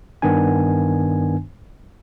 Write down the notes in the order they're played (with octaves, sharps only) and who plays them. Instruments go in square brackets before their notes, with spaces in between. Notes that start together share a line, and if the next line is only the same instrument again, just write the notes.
[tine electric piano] G2 D#3 B3 D4 G#5